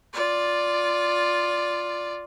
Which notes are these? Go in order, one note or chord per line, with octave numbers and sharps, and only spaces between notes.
F4 D5